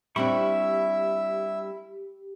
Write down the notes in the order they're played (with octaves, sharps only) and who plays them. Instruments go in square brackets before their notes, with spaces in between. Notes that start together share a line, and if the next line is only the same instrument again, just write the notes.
[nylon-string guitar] G3 C4 D4 [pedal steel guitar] E4 B5 C#6 [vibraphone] G4 [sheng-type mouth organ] E5